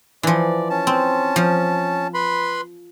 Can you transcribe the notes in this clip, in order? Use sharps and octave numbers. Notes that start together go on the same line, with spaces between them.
E3 F3 D5
C#4 A5
C4
F3
B4 B5 C6